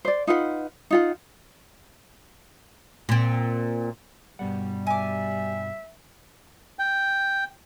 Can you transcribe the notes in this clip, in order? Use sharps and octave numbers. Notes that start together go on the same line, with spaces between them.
C5 D5
D#4 F4 B4 F#5
D#4 F4 F#5
A#2 C4
G2 B2 G3 F#5
E5 G#5 D6
G5